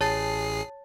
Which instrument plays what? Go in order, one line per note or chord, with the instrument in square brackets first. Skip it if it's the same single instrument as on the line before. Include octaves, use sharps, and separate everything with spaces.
[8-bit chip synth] A1 G#4 C7 [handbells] C#5 A5 A6